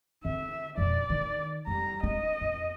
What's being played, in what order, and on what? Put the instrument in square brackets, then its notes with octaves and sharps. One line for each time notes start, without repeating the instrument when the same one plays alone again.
[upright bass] D3 C4 [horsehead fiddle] E5
[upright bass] F2 B2 [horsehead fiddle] D5
[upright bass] D#3
[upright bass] F2 [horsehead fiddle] G3 A#5
[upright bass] C4 D4 [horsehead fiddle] D#5
[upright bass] F2